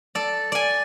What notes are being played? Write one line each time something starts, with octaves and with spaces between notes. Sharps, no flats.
A4 D5
D5 G#5